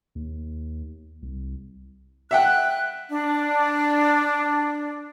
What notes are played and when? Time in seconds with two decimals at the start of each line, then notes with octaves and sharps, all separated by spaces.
0.15 D#2
1.22 C2
2.31 E5 F#5 G5 F#6
3.09 D4